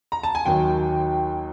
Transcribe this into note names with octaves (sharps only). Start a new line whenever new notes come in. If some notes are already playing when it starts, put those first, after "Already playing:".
A#5
A5
G#5
D#2 D#3 F#3 G5